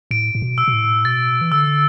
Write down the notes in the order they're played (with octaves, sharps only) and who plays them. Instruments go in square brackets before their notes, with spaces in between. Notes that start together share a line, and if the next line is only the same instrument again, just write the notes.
[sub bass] A2 [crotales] D7
[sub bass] A2
B2
[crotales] E6
[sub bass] B2
A2
[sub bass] B2 [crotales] A6
[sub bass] E3
[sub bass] D3 [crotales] E6